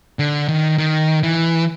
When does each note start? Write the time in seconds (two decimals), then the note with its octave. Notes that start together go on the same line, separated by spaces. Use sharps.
0.19 D3
0.48 D#3
0.78 D#3
1.23 E3